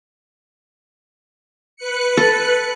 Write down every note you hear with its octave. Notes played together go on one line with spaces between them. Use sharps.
B4 F#6 C#7
A4